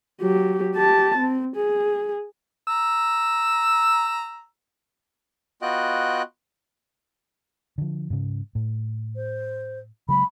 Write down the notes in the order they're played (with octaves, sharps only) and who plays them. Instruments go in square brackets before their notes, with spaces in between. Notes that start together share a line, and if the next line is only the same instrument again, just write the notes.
[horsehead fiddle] F#3 G4
G4 A5
C4
G#4
[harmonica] A#5 E6
[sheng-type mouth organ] B3 F4 F#4 D#5 G5 F#6
[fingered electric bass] D3 F3
G#2 C#3
A2
[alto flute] C5
[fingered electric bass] C#3 F#3 G#3 [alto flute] B5